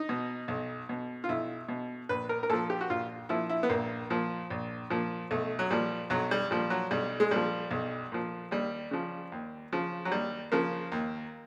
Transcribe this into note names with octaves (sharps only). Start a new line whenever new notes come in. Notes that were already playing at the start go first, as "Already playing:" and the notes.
Already playing: D#4
B2
B1
B2
F4
B1 E4
B2
A#1 B4
A#4
A#4
A#2 F3 A4
G4
F#4
A#1 F4
A#2 F3 E4
E4
B3
A#1 A#3
A#2 F3
A#1
A#2 F3
B1 A3
F#3
A#2 F3 G3
B1 F#3
G3
A#2 F3 G3
F#3
B1 G3
G#3
A#2 F3 G3
B1
A#2 F3
D#2 G3
C#3 F3
D#2
C#3 F3
F#3
D#2 G3
C#3 F3 A#3
D#2